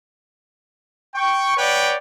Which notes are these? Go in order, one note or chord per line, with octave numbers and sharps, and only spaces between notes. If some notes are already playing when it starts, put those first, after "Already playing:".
G5 C#6
B4 C#5 D5 F#5 G5